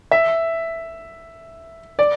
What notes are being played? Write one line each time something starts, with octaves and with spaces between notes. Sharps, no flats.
E5
D5